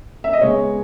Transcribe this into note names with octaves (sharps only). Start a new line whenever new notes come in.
E5
D#5
C#3 G#3 B3 C#5